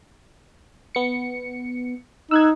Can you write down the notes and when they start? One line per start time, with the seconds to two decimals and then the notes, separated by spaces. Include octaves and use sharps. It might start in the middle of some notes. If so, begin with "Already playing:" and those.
0.95 B3 C#7
2.31 D#4 E6 F#6 G#6